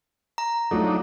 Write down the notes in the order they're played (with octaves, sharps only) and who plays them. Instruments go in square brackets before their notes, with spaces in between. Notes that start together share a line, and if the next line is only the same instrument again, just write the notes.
[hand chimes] A#5
[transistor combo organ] F#3 D4 D#4 [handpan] A3 F4 A4